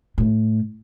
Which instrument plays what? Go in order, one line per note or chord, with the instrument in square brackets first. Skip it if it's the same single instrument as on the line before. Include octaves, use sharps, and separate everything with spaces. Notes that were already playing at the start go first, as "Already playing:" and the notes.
[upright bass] A2